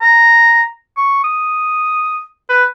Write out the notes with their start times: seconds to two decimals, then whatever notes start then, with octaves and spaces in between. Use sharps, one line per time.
0.02 A#5
0.97 C#6
1.24 D#6
2.49 B4